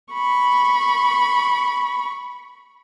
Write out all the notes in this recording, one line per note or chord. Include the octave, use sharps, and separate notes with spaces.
B5 C#6